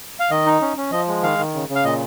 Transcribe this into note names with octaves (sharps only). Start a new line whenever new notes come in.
F5
D#3 D#5
D#4
C#4
C#4
F3 D#5
G#3
D#3 F5
D#3
C#3
C#3
F5
A#2 D#5